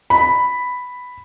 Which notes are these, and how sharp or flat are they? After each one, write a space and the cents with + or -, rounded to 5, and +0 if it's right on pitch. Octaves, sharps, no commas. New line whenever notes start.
B5 +5